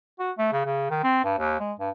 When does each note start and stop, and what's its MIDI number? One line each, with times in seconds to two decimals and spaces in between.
0.20 0.32 66
0.38 0.48 57
0.53 0.61 49
0.66 0.90 49
0.91 1.02 51
1.03 1.22 60
1.24 1.38 43
1.38 1.57 39
1.60 1.73 56
1.80 1.90 43